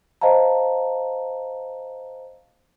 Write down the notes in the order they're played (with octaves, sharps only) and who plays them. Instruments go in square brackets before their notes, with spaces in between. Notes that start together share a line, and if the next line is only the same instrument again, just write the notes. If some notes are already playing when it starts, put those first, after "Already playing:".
[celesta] C5 D#5 F5 A5 A#5